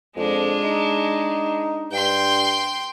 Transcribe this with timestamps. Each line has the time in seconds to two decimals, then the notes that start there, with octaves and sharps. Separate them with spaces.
0.16 F2 G#3 D4
0.64 D#4
1.92 G2 G5 C6